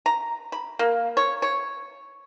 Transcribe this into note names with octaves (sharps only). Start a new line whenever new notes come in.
A#5
B5
A#3
C#5
C#5